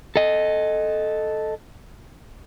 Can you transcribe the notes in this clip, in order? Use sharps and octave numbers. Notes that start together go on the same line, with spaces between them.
A4 D#5